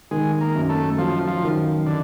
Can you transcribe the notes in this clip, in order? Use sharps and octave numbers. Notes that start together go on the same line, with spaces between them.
D#3 G#3
A#3
F#2
A3
F3 F#3
F3
D#3
D3